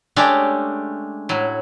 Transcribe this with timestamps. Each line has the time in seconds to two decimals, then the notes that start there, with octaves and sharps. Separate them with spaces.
0.16 G#3 A3 C#4 D4 G4 D5
1.29 A2 F#3